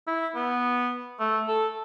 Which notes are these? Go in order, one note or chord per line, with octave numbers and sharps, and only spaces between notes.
E4
B3
A3
A4